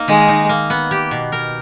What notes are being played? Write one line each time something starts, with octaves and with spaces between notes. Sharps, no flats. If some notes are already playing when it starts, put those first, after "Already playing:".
Already playing: A#3 D#4
D#3 G#3
D#4
A#3
B3
G4
B2
A#4